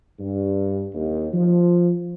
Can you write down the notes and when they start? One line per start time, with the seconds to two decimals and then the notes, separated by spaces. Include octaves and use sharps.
0.20 G2
0.94 D#2
1.33 F3